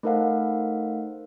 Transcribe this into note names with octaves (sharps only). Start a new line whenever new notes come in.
A3 D#4 A#4 C5 F5 F#5